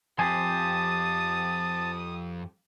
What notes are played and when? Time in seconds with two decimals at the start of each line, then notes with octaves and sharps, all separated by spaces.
0.19 F2 G4 C5 G#5 A5 D#6